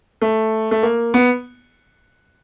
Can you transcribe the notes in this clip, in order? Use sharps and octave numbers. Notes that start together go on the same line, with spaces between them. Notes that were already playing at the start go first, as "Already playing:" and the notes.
A3
A3
A#3
B3